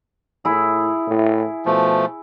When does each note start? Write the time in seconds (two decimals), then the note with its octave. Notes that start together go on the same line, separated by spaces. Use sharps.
0.45 A2 E4 G#4
1.08 A2
1.66 B2 F3 A3